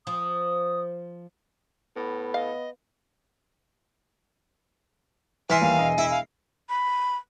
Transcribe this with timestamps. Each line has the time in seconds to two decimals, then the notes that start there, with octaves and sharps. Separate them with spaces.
0.07 F3 D#6
1.97 A2 B3
2.34 D#5 F5
5.50 E3 E5 G#5 C6 F6 B6 C7
5.61 D#2 G3 F5
5.78 E1 D#5
5.98 E4 E5
6.10 F5
6.69 B5